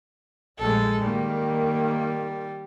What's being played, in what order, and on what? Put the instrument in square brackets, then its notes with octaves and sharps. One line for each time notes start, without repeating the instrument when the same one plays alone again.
[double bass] A#1 G#3 [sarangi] A4
[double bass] D#3 A#3 [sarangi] G3